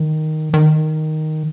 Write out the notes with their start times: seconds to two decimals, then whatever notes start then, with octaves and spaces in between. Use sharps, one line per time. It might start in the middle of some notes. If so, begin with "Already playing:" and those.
Already playing: D#3
0.54 D#3